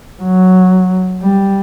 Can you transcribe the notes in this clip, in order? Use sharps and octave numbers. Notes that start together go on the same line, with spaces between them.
F#3
G3